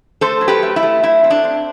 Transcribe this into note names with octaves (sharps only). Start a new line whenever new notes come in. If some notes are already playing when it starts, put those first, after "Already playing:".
A3 A4 C5
F#3
G4 B4
A3
E4
A3
F#3 E4
C4
D4
C4